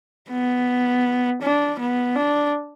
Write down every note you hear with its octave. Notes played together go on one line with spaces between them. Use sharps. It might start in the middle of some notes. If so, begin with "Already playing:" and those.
B3
D4
B3
D4